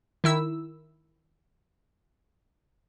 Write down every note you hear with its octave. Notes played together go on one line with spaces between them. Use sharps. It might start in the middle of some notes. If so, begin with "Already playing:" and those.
D#3 E4 E6